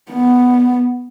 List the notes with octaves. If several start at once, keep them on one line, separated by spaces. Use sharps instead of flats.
B3